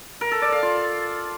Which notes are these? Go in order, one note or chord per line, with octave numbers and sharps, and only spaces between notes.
A#4
A4
D5
F5
F4